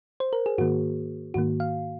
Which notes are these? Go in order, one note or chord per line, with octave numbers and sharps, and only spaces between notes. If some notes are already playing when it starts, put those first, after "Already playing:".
C5
A#4
G#4
G#2 D#3 A#3 F#4
G#2 D#3 A#3 F#4
F5